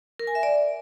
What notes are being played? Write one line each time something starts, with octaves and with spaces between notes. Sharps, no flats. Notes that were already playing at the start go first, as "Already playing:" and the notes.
A#4
G#5
E5
D5